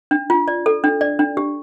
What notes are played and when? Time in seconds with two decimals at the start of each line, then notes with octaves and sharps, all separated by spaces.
0.11 D4
0.30 F4
0.48 D5
0.66 A4
0.84 D4
1.01 D5
1.19 D4
1.37 G4